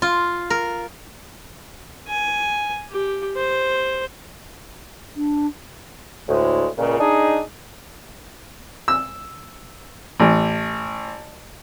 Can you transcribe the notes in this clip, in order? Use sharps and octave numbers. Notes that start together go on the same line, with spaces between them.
F4
A#4
G#5
G4
C5
D4
D2 A2 G#3
C#2 A#2 C#3
D4 D#4 G#4
E6
A1